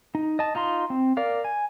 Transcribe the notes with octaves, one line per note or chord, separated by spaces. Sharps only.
D#4
D#5 A5
D#4 F4 A#5 C6
C4
A#4 D5 F5
G#5